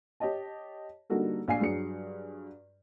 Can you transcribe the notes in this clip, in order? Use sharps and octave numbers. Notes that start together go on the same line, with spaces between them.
G4 C#5 D#5 A5
D3 G3 A#3 D#4 F#4 A4
A#1 F5 G#5 C7
G2 F#3 G#4 C#7